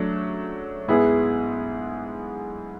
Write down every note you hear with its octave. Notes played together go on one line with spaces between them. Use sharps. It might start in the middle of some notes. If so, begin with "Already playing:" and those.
Already playing: F#3 A3 D4
G#2 G#3 B3 E4 G#4